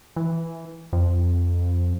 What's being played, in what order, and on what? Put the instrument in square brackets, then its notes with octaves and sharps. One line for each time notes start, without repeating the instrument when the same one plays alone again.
[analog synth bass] E3
F2